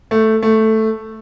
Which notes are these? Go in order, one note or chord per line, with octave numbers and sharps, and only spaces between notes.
A3
A3